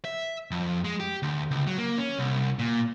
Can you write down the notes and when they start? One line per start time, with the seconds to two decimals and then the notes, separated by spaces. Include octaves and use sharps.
0.05 E5
0.51 F2
0.85 G#3
1.00 G4
1.22 D2
1.51 C#2
1.67 F#3
1.78 A#3
1.98 C#4
2.19 C2
2.59 A#2